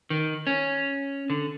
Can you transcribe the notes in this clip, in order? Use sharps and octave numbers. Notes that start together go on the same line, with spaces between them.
D#3
C#4
D3